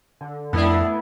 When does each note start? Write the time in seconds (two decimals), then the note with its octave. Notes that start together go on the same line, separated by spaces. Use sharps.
0.21 D3
0.53 F2 G#2 A3 B3 D4 E4